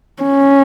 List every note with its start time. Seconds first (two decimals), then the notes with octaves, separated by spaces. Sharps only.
0.23 C#4